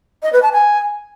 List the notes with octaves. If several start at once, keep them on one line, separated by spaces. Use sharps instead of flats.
D#5
B4
A5
G#5